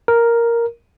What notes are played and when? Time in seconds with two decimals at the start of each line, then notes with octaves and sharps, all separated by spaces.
0.08 A#4